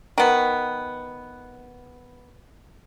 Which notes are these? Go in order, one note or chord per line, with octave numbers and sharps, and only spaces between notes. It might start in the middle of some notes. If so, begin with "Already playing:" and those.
D#3 B3